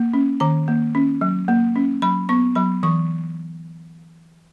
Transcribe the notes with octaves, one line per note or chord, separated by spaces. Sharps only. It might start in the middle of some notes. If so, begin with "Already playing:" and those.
Already playing: A#3
C#4
D#3 A#5
A#3
C#4
F#3
A#3
C#4
F#3 B5
B3 C#6
F#3 B5
E3 C#6